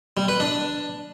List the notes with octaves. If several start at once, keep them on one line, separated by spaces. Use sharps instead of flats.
G3
B4
D4